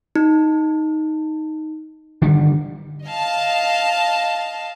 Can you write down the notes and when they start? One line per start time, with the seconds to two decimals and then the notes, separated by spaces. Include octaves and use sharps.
0.16 D#4
2.22 D3 D#3 G3
3.06 D#5 F5 A5